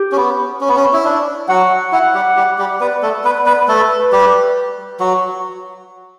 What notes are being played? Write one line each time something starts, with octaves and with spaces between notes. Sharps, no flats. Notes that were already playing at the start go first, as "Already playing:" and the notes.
Already playing: G4
C#4
B3
C#4
B3
C#4
E4
D4
F#3 F#4 F#5
E4 F#5
G3 G4
G3 G4
G3 G4
B3 B4 D5
A3 A4
D5
B3 B4
D5
B3 B4
A3 A4 B4
G3 G4
F#3 F#4